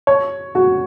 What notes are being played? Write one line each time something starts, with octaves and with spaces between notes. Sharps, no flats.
C#5
F#4